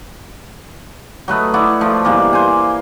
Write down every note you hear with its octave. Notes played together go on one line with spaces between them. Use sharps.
F#3 A3 B4 D#5
E4 F#4 D5 D#5
F3 A3
G2 B2 E3 A#3
C5 G#5